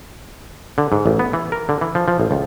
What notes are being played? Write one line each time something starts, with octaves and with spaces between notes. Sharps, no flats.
D3
G#2
A1
B3
E3
A#4
D3
E3
F3
F3
A1
C#2